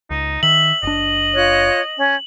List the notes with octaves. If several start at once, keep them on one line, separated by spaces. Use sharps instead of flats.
C#2 D#4
D#3 E5 F#7
F#1 D4 D#5
F4 C#5 F#6
C#4